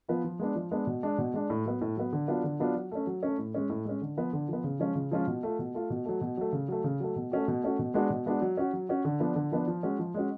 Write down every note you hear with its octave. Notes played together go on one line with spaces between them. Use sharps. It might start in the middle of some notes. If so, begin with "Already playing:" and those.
F3 B3 F4
F3
G#3 B3 D4
F3
G#3 B3 D4
B2
G#3 D4
B2
G#3 D4
A2
F#3 B3
A2
F#3 B3
D3
F#3 B3 D4 F4
D3
F#3 B3 D4 F4
F#3
A3 C#4
F#3
A3 C#4
A2
G#3 C#4
A2
G#3 C#4
D3
F3 B3
D3
F3 B3
C#3
F3 G#3 C#4 F4
C#3
F3 G#3 C#4 F4
B2
A3 F4
B2
A3 F4
B2
F#3 A3
B2
F#3 A3
C#3
F#3 A3
C#3
F#3 A3
B2
A3 C#4 F#4
B2
A3 C#4 F#4
B2
G#3 B3 D4 F#4
B2
G#3 B3 D4 F#4
F#3
C#4 F#4
F#3
C#4 F#4
D3
F3 B3 D4
D3
F3 B3 D4
F3
G#3 C#4 F#4
F3
G#3 C#4 F#4